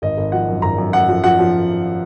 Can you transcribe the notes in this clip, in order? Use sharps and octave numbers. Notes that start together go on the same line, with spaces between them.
G#1 D#5
G#1
F3 F#5
F#2
G#1 A#5
F#2
F#2 F#5
F3
F3 F#5
F3